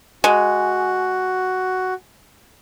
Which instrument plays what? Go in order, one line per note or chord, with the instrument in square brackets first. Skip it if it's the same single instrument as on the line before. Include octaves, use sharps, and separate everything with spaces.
[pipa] G#3 [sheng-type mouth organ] F#4